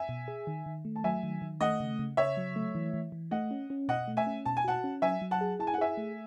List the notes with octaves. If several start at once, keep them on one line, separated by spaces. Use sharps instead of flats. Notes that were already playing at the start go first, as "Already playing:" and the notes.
Already playing: E5 G#5
B2
G#4
D#3
D#3
A3
A5
F#3 E5 G#5
D#3
D#3
A3 D#5 F#5
C#3
C#3
C#3 C#5 E5
F#3
A3
E3
E3
E3
A3 D#5 F#5
C#4
C#4
B2 D#5 F#5
A3
E5 G#5
C#4
B2 A5
G#5
F#4 F#5 A5
C#4
F#3 E5 G#5
F#3
F#5 A5
G#4
E4 A5
G#5
F#5
G#4 E5 G#5
A3